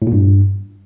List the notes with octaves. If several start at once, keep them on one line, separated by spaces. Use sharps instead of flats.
A2
A#2
G2